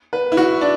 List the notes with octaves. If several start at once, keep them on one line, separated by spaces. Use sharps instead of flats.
B4
E4
F#4
D4